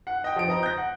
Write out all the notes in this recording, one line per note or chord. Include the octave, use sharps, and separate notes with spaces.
F#5
D#5 G5
F3 D7
C4 D#5 A#5
G6 A#6
F#5